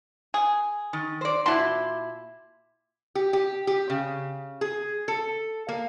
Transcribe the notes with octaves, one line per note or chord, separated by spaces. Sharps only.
G#4
D#3
C5 D5
A#2 E4 F#4 A5 C6
G4
G4
G4
C#3
G#4
A4
A#3